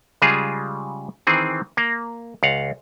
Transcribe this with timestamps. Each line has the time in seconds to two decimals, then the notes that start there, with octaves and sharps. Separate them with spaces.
0.22 C#3 G3 G#3 F4 G#4
1.27 D#3 E3 C4 G#4
1.77 A#3
2.43 C#2 F5 F#5